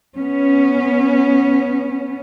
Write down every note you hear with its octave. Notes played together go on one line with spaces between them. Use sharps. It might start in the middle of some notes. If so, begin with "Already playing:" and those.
B3 C#4